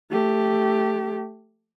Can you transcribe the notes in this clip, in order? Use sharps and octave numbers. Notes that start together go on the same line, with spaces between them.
A3 G4